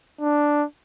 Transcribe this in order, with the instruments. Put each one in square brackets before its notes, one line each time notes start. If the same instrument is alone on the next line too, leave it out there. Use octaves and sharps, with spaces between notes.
[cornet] D4